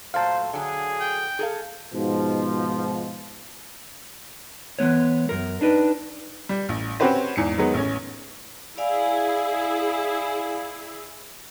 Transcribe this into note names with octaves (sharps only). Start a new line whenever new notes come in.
A#2 F#3 A3 C5 F5 A5
D3 F#3 G#4
G5
G#4 A4 F5
G#2 B2 F3
E3 G#3 B3 C#5
F#2 A#4
D4 D#4 B4 G5
G3
A1
C4 C#4 F#4 G4 B4 C5
E2 G#2 C#7
D#3 F#3 G#3 B3
A1 C#4
E4 G#4 D5 F5 G#5